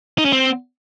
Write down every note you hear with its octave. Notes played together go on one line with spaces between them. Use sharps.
D#4
C#4
C4